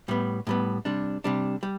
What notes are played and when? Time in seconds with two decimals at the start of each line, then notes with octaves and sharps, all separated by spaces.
0.08 A2 G3 B3
0.47 A2 G3 B3
0.85 C3 G3 D4
1.24 C3 G3 D4
1.63 G3